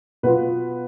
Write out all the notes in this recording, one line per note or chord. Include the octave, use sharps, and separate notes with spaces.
B2 B3 F4 B4